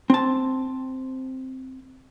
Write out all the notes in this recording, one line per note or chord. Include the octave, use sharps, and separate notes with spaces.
C4 A5